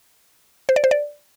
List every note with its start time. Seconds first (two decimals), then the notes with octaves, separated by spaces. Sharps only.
0.69 C5
0.76 D5
0.84 C5
0.91 D5